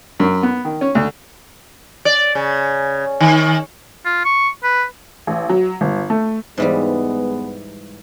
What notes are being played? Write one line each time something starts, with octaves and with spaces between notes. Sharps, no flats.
F#2
B3
D#3
C#4
D2
D5
C#3
D#3
F4
C#6
B4
A1
F#3
G1
A3
G#2 E3 G3 G#3 B3